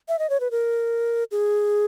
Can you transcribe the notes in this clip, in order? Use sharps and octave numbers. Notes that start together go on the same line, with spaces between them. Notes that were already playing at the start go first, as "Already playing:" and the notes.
E5
D#5
C#5
B4
A#4
G#4